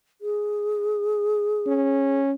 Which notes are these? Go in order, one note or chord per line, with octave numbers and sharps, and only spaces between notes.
G#4
C#4